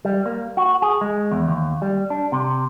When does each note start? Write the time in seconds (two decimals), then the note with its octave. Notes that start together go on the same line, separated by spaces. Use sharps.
0.05 G3
0.26 A#3
0.57 F#4
0.82 G#4
1.01 G#3
1.31 E2
1.48 D#2
1.82 G3
2.10 D4
2.32 C3